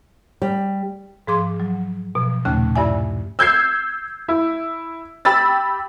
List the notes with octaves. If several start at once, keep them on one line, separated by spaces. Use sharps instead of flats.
G3
G#2 F3 G#4 C6 D6
F#3
B2 F3
D#2 A#2 C#3 A3 C#4 F#6
G2 E4 D5 E5 G#5
E6 G6 G#6 C7
E4
G4 B5 E6 A6